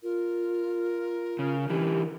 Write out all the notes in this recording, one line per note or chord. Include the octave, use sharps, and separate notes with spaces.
F4 A#4
C#3
D3 E3 G4